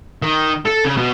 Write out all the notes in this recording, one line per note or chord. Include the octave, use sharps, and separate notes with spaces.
D#3
A4
C#3
B2